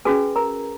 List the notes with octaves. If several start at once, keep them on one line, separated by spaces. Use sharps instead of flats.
C#4 F#4 G#4 B4 G#5
A#4 A#5